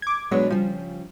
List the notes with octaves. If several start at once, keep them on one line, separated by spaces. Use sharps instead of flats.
D6 G#6
B2 F#3 G#3 D4 B4 C#5
C#3 F3 G3